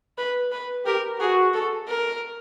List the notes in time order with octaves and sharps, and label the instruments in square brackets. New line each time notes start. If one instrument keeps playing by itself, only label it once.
[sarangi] B4
B4
[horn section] G4 [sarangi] A#4
[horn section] F#4 [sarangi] G#4
[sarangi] A4
A#4